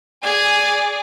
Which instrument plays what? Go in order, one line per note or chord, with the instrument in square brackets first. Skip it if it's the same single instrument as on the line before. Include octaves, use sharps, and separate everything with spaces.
[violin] G#4 D5 [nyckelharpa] G#5